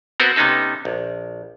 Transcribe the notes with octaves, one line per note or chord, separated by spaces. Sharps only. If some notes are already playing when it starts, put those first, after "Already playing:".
B3 C4 F#4 A#4 B4
C3 B3 C#4 D#4 A4
A#1